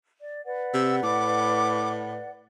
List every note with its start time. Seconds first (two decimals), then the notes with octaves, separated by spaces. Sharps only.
0.20 D5
0.46 B4 D5 F#5
0.74 C3 E6
1.03 A2 D6